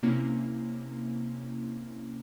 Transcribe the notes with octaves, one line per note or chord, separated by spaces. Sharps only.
C3 A#3 C#4 E4